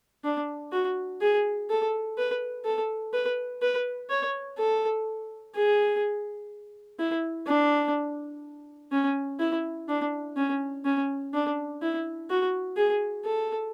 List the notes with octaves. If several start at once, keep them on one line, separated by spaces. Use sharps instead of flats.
D4
F#4
G#4
A4
B4
A4
B4
B4
C#5
A4
G#4
E4
D4
C#4
E4
D4
C#4
C#4
D4
E4
F#4
G#4
A4